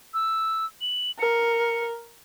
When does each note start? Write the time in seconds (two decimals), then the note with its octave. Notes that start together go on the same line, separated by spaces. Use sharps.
0.14 E6
0.81 F#7
1.20 A#4 C#7